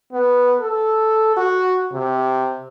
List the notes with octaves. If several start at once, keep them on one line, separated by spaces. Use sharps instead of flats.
B3
A4
F#4
C3